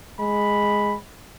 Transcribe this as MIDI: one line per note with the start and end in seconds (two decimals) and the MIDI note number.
0.20 0.94 56
0.20 0.97 83